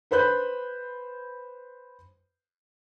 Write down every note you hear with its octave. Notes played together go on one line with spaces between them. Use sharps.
B4 C5 B5 F#6 G6